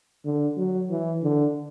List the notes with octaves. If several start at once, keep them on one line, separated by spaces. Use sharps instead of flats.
D3
F#3
E3
D3